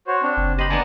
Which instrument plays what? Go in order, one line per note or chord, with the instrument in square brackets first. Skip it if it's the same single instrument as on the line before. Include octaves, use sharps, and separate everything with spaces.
[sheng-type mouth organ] F#4 C5 C#5
C4 D4
[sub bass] F#1
[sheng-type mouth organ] G4 C6 [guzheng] D#5 B5
[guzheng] D3 A#3 B3 [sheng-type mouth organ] D5 G#5 A5